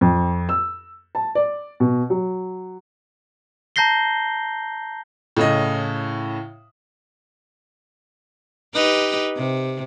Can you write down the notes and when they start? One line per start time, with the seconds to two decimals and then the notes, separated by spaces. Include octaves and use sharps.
0.01 F2
0.49 E6
1.15 A5
1.35 D5
1.80 B2
2.10 F#3
3.76 A5 A#5 G6 A#6 C7 G7
5.37 A2 C#3 D#5
8.74 D#4 G4 B4
9.36 C3